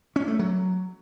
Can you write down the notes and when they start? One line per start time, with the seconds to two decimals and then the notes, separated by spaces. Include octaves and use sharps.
0.16 C#4
0.28 A3
0.39 F#3